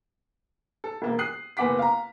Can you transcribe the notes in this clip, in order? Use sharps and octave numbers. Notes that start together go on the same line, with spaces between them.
A4
E1 A#3
D#6 F#6 C7
F#1 B3 F#5 D6 B6
F5 A#5